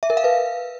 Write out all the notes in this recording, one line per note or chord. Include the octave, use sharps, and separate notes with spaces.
E5
A#4
F5
B4